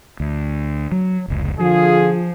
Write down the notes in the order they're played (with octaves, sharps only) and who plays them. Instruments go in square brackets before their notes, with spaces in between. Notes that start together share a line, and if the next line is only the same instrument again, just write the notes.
[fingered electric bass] D2
F#3
F1 C#2
[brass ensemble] D3 F4 G#4 [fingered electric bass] F3